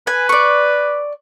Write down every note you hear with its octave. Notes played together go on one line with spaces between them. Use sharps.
B4 G#5
D5 C#6